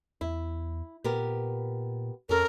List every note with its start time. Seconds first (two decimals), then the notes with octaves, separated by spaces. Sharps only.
0.21 E2 E4
1.04 A#2 B3 G4 A#4
2.29 F2 C#4 A4 A#4